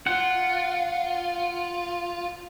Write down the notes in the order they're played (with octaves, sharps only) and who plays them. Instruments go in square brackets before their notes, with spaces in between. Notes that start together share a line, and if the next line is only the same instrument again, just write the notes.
[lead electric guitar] F4 [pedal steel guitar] F#5